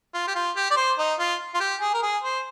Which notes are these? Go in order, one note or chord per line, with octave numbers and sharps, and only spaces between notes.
F4
G4
F4
G4
D5
C5
D#4
F4
F4
G4
G#4
A#4
G#4
C5